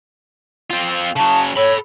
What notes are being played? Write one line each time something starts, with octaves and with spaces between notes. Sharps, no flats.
C4 F4
C#3 F#3 A5
A4 C#5 B5